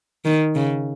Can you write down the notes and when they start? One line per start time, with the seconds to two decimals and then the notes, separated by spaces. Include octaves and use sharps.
0.25 D#3
0.55 C#3